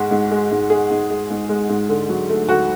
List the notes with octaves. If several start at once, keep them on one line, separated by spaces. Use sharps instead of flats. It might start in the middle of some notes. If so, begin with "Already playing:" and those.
Already playing: G#2 G#3 F#4
G#2
G#3
G#2
G#3 G#4
G#2
G#3
G#2
G#3
G#2
D3
F#3
A3
D2 F#4